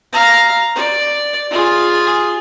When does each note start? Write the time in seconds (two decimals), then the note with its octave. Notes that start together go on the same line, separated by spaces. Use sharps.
0.13 F5 A#5
0.76 D5
1.51 F4 G#4